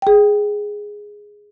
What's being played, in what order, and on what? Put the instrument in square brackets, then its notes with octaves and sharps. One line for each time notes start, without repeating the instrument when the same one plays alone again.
[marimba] G#4 G5